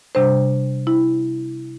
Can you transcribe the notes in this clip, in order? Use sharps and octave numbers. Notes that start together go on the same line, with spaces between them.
C3 G3 D4 C5
E4